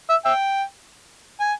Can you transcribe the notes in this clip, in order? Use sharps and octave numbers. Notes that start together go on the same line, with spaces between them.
E5
E5 G5
G#5